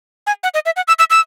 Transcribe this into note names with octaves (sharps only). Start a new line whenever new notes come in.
G#5
F#5
D#5
E5
F#5
E6
E6
E6